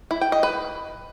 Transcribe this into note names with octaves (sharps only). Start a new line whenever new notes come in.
E4
G5
D#5
B4